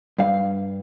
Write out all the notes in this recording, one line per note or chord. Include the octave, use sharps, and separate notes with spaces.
G2 F5